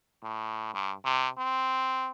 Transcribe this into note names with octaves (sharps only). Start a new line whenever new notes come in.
A2
G2
C3
C4